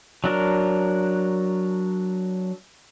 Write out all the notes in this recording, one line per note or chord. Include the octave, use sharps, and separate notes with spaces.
F#3 D4 A#4